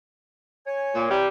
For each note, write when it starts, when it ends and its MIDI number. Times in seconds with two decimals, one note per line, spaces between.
0.66 1.15 73
0.66 1.15 80
0.94 1.07 46
1.09 1.27 48
1.09 1.27 52
1.09 1.27 55